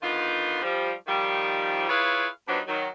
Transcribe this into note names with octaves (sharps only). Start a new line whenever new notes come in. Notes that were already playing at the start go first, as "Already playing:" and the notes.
D3 D#3 B3 D#4 F4
F3 G3
D#3 F3 G3
E4 F4 G#4 B4 C#5 F5
G2 F3 F#3 B3 D4 D#4
D#3 F#3